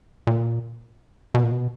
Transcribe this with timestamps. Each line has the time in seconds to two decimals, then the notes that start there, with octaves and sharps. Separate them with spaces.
0.27 A#2
1.34 B2
1.43 A#2
1.52 B2